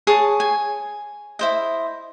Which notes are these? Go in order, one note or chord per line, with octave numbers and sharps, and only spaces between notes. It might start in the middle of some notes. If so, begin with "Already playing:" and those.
G#4 C#5 A5
G#5
E4 C5 D#5